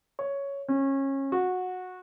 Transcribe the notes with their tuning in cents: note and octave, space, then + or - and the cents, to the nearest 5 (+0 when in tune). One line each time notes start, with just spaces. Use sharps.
C#5 +5
C#4 -25
F#4 -15